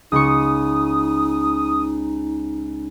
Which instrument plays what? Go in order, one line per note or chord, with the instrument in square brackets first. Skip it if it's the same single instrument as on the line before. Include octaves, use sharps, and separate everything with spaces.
[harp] C#2 C#6 [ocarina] D#4 [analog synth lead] D#6